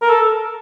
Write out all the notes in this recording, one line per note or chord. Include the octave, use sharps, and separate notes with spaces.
A#4
A4